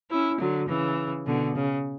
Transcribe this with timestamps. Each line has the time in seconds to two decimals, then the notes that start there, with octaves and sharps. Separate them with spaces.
0.11 C#4 E4
0.40 D3 F#3
0.68 C#3 E3
1.26 B2 D3
1.55 C#3